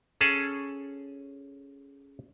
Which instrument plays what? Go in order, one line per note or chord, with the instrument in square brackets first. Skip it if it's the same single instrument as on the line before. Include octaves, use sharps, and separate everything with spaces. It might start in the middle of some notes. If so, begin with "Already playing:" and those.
[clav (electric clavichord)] C#4 G#4 A4 A5